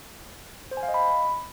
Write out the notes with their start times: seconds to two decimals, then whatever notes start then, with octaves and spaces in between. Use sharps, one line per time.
0.71 C5
0.77 G#5
0.83 F5
0.89 D#5
0.94 B5